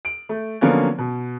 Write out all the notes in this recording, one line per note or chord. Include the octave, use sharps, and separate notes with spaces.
D7
A3
D3 F3 F#3 A#3 B3 C#4
B2